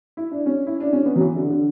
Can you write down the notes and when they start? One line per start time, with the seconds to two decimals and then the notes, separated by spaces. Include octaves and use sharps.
0.17 E4
0.31 D4
0.46 C#4
0.67 E4
0.80 D4
0.93 C#4
1.06 B3
1.16 F#3
1.21 E3
1.36 D3
1.50 D3